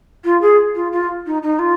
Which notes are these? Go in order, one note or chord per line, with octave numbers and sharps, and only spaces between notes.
F4
G#4
F4
F4
D#4
D#4
F4